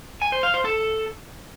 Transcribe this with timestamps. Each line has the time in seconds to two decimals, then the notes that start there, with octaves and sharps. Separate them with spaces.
0.22 G#5
0.32 C5
0.43 F5
0.54 C5
0.65 A4